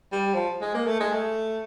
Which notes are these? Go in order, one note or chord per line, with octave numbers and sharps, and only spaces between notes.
G3
F3
G#3
A#3
A3
G#3
A3